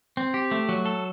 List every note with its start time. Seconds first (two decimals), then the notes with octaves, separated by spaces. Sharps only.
0.17 C4
0.34 G4
0.51 A3
0.69 F#3
0.85 A4